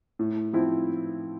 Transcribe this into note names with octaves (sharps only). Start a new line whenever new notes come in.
A2
F3 C4 E4